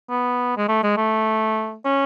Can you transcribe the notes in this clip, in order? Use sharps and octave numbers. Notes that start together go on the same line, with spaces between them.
B3
G#3
A3
G#3
A3
C#4